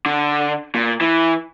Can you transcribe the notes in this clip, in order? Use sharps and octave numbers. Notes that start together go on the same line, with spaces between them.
D3
A#2
E3